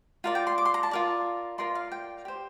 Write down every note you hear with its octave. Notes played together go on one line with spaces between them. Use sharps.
F4 A#4 D5
G5
C6
D6
C6
A#5
A5
F4 A#4 D5
F4 A#4 D5 C6
F5
G5
G4 C5